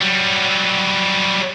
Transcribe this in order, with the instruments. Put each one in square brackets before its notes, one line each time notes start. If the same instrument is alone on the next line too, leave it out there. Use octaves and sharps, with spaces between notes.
[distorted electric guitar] F#3 G3